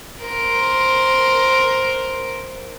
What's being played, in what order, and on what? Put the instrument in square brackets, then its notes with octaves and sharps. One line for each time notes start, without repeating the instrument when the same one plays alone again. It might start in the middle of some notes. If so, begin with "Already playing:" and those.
[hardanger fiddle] A#4 C5